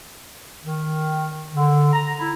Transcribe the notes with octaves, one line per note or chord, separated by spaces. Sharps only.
D#3
D3
A#5
E4